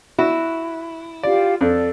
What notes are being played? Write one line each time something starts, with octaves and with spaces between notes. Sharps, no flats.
E4 F#4
F4 G4 D5 F5
F2 A4 D5